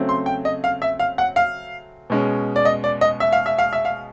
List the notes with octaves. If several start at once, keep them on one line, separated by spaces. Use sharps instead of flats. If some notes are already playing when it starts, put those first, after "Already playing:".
Already playing: C#3 F#3 A3 C4
C6
G5
D#5
F5
E5
F5
F#5
F5
B2 G#3 C#4
D5
D#5
D5
D#5
E5
F5
E5
F5
E5
F5